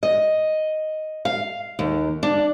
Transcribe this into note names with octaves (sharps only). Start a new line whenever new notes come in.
D#5
F5
D#2
D4